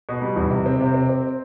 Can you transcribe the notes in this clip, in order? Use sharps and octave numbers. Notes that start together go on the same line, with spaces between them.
B2
G3
E2
C3
C4
C3
C4
C4